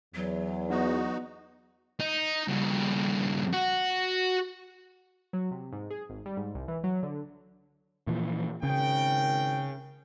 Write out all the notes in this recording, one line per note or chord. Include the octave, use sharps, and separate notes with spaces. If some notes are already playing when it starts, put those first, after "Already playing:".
E2 F#3
B3 D#4 F#4
D#4
G2 C#3
F#4
F#3
C3
G#2
G#4
G#1
G3
G#2
C2
E3
F#3
D3
A#2 E3 F3
G#1 C#3 A#4 G5